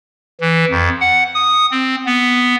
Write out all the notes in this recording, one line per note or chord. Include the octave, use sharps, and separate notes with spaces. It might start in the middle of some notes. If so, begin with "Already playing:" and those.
E3
F2
F#5
D#6
C4
B3